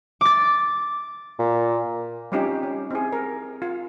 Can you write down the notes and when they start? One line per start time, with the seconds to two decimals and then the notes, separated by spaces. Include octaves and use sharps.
0.21 D6 A6
1.39 A#2
2.32 G3 C4 C#4 D#4 F4 G4
2.63 C#4
2.91 C4 E4 G#4
3.13 A#4
3.62 F4